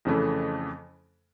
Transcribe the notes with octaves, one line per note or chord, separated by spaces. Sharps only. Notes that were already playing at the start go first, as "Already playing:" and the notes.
F2 C#3 E3 A3